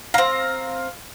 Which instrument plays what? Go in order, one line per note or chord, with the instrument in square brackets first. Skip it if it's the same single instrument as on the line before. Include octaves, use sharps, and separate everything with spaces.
[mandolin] C4 A#5 [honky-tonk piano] F5